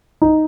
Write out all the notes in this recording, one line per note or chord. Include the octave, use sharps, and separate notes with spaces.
D#4